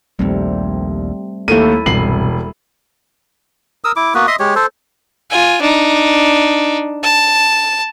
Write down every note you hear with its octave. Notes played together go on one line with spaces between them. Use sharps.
A#1 D#2 G3 A3 C4
D#2 A3 A#3 E4 A4 D#7
E1 C2 G2 C3 C7 F#7
A#4 D#6 E6
E4 D6
A#3 B3 F#4 B4
D#5 E5 C6 D#6
G#3 G4 C#5
A4 C5
F4 G#5
D4 D#4
A5